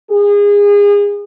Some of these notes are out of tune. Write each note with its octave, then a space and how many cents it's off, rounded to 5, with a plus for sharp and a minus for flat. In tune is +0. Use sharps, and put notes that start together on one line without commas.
G#4 -30